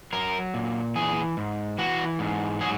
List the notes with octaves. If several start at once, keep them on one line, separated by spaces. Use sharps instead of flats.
F#3 A#4
A#2
E3 G#4
G#2
E3 F#4
G#2
F#3 G#4